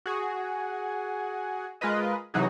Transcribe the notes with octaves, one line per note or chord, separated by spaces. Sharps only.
F#4 G#4
G#3 F4 A#4 B4 D#5
C3 E3 F#3 D#4 F#4 G#4